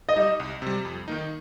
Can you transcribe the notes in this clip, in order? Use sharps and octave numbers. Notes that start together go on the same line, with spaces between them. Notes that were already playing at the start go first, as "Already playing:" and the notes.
D#5
G3 D#4
C2
C3 G3
F2
D#3 A#3 D#4